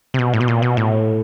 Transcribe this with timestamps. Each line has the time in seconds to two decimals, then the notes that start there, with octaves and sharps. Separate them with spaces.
0.14 C3
0.19 B2
0.34 A2
0.40 B2
0.48 A#2
0.62 B2
0.77 A2